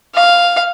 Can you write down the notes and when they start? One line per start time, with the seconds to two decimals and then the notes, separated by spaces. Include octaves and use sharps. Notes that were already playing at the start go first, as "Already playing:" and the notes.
0.16 F5